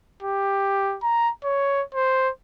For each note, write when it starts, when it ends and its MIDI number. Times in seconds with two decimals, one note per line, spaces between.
0.22 0.97 67
1.03 1.30 82
1.44 1.82 73
1.94 2.29 72